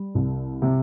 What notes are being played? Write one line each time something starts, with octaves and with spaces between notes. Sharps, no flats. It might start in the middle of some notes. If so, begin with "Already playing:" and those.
Already playing: G3
C2
C3